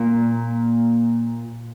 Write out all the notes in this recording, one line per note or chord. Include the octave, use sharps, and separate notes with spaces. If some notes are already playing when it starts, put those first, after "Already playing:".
Already playing: A#2